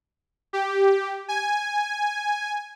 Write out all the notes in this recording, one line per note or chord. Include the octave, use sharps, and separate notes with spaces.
G4
G#5